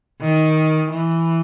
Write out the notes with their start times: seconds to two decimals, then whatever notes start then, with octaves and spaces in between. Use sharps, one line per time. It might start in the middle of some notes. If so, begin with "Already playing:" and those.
0.20 D#3
0.91 E3